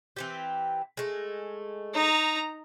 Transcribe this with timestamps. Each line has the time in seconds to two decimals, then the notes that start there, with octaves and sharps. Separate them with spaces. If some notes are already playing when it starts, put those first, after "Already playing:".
0.17 E3 C4 G4
0.97 G#3 A3
1.94 D#4 A#5